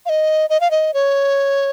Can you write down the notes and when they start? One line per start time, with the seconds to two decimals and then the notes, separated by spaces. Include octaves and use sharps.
0.06 F5
0.09 D#5
0.50 D#5
0.61 F5
0.71 D#5
0.94 C#5